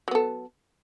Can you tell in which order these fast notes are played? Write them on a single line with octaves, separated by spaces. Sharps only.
F#3 B3 A4